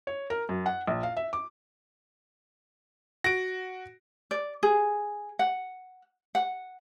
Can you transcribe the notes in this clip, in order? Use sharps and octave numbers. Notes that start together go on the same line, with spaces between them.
C#5
A#4
F#2
F#5
A#1
F5
E5
D6
F#4 A#6 D7
D5
G#4
F#5
F#5